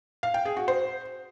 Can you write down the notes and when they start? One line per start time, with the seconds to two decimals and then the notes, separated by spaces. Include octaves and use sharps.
0.23 F5
0.34 G5
0.45 G#4
0.57 F#4
0.68 C5